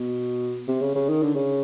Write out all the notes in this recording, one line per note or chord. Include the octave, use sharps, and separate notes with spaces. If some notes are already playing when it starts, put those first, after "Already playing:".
Already playing: B2
C3
C#3
C#3
D#3
D3
C#3